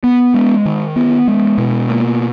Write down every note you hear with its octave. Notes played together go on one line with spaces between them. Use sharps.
B3
G#3
D#3
B3
G#3
B2
A#3